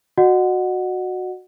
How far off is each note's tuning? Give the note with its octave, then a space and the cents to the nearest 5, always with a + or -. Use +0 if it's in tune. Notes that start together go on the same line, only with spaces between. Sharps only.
F#4 -10 D#5 -40 F#5 +0